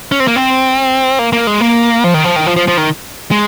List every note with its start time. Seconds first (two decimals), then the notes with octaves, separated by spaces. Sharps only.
0.12 C#4
0.20 C4
0.28 A#3
0.36 C4
1.19 A#3
1.33 A#3
1.47 G#3
1.61 A#3
2.04 F3
2.14 D#3
2.24 F3
2.36 D#3
2.46 F3
2.56 F3
2.68 F3
2.77 D#3
3.31 G#3